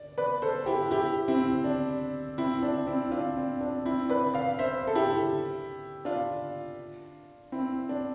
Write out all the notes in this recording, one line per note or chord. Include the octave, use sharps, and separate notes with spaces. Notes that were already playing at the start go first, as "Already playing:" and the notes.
Already playing: D5
B4 D5
A4 C5
E4 G4
E4 G4
C4 E4
D4
C4 E4
D4
C4 E4
D4 F4
C4
D4
C4 E4
B4 D5
D5 F5
C5 E5
A4
E4 G4
D4 F4
C4 E4
D4